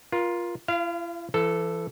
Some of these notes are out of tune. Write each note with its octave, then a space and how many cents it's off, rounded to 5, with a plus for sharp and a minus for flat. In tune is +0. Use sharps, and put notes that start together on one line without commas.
F4 +0 A#4 +35
E4 +45 F5 -20
E3 +30 A4 +0